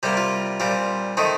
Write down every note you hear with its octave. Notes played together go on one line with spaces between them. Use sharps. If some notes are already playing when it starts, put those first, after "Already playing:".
C3 G3 A#3 G4
F4
A#2 G3 C4 F4
D#3 A3 C4 D#4